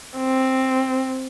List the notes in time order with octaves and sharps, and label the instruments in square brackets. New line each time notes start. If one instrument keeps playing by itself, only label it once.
[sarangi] C4